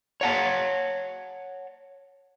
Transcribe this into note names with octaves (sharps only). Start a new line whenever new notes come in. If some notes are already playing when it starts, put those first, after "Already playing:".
C#5 F#5 A5